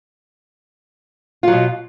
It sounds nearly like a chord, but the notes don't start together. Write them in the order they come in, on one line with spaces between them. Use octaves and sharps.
F4 F#3 B2